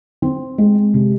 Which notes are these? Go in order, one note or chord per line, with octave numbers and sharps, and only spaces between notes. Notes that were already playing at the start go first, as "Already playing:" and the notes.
C4
G#3
C3